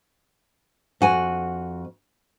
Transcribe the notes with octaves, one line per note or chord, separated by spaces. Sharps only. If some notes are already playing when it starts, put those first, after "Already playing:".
F2 F#4 G#5